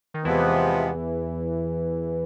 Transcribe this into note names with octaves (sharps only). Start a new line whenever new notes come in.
D#3
E2 C3 E3 F3 G#3 B3